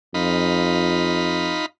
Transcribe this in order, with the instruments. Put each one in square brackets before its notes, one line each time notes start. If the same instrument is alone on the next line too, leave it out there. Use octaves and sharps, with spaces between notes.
[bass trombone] F2 [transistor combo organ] D#4 F4 B5